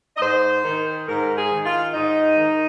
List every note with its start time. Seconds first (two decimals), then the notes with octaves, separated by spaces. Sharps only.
0.17 D#5
0.21 G#2 C5
0.64 D#3
1.07 G#2 A#4
1.37 G#4
1.51 D#3
1.65 F4
1.94 G#2 D#4
2.37 D#3